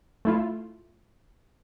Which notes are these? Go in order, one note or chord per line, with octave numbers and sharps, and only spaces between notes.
A3 E4 F4